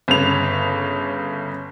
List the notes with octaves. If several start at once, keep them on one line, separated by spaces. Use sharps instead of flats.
G1 C#3 F7